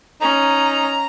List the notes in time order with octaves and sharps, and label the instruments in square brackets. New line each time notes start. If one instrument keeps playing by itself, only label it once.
[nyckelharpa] C#4 [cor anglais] D#4 [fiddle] A#5